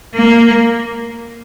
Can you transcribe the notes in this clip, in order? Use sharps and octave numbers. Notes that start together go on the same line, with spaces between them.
A#3